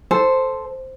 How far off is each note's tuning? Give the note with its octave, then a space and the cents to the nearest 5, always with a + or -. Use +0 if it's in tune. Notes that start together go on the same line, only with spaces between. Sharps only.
A4 +0 C5 +0